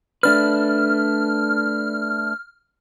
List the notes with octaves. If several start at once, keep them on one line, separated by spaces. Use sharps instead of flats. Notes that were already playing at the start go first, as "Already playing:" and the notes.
A3 D4 B4 F6